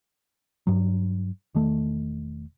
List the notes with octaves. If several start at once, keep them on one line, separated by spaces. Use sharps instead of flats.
G2 F#3
E1 D#3 A3